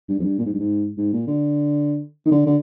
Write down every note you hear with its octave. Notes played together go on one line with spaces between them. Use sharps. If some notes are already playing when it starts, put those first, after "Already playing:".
G2
F2
G2
A#2
G#2
G2
G#2
G#2
A#2
D3
D#3
D3
D3